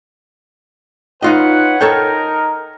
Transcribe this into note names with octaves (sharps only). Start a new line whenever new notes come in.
D#4 F4 B4 C#5 D#5 F#5
D#4 A4 A#4 C#5 G5